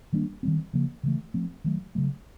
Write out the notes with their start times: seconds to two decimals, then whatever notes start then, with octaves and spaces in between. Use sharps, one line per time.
0.13 D#3 G3 A#3 D4
0.43 D#3 G3 C4
0.73 C#3 F3 A#3
1.03 C#3 E3 A3
1.34 F3 A3 C4
1.64 D#3 F#3 A3
1.95 C#3 F#3 A3